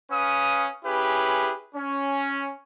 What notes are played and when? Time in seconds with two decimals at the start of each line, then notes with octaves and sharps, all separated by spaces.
0.11 C#4 B4 F5 D#6
0.85 C#4 E4 G4 G#4 B4
1.75 C#4